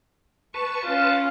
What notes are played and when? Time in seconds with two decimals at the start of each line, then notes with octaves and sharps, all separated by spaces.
0.54 B4 A5 C#6
0.85 C#4 F4